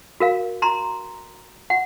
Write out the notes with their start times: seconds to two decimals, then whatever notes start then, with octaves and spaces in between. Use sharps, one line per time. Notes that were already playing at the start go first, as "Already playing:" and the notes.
0.20 F#4 A#4 F5
0.62 A#5 C6
1.70 F#5